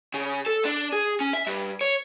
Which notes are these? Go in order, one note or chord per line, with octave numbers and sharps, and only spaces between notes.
C#3
A4
D4
G#4
C#4
E5
G2
C#5